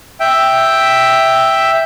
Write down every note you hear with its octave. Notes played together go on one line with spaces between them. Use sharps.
E5 G5